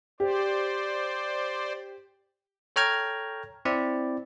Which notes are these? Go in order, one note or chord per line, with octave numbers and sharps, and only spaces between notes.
G4 C5 D5
A4 C#5 G5 A#5 F6 G#6
C4 E4 D5